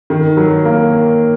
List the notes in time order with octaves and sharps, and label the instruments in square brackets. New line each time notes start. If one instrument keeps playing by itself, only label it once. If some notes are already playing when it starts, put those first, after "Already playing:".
[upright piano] D#3
F#3
A#3